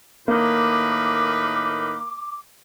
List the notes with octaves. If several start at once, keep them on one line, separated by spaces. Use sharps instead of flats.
A2 D#3 A#3 B4 D6